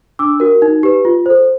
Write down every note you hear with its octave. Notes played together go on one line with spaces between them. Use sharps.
D4 D6 E6
F#4 A#4
D#4
G4 B4
F4
A4 C5